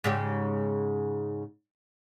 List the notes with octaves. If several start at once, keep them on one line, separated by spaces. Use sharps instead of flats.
G#2 C#3 G4